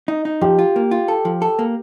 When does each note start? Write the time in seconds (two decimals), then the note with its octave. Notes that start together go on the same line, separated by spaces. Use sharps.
0.08 D#4
0.25 D#4
0.41 F3 G4
0.59 F4
0.76 A#3
0.91 F4
1.08 A4
1.25 F3
1.42 A4
1.59 A#3